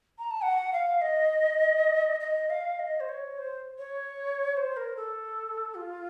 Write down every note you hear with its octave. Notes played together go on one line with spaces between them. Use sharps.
A#5
A5
F#5
F5
D#5
D#5
F5
D#5
C5
C#5
C5
C#5
C5
A#4
A4
F4